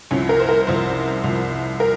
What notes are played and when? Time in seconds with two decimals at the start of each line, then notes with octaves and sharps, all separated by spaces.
0.11 C2 C3 F3 C#4
0.29 A#4
0.40 C5
0.49 A#4
0.67 C2 C3 F3 C5
1.24 C2 C3 F3
1.80 A#4